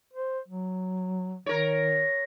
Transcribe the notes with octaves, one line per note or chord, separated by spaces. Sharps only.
C5
F#3
D#3 A#4 C#5